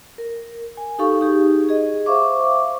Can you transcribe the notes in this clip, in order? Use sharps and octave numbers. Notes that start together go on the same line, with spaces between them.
A#4
G#5
D#4 G4 A4 F5 C#6
D#4 G4 G#4
G#4 D#5
C5 E5 F5 C#6 D6